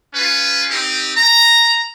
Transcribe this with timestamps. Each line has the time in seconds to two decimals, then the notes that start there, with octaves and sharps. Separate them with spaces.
0.13 C#4 F4 B4
0.69 C4 D#4 G4
1.15 A#5